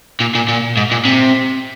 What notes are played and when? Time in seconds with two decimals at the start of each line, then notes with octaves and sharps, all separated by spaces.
0.20 A#2
0.35 A#2
0.48 A#2
0.77 G#2
0.91 A#2
1.05 C3